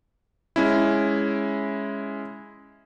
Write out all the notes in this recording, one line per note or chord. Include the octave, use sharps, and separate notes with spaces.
G#3 C#4 E4